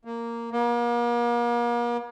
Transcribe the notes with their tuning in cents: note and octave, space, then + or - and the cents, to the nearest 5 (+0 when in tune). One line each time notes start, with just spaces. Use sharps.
A#3 -5
A#3 +40